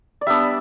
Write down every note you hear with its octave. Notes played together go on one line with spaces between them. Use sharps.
D5
G3 B3 D4 E5